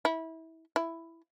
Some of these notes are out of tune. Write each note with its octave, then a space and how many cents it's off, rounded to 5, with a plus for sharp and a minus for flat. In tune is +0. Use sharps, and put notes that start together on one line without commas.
E4 -25
E4 +5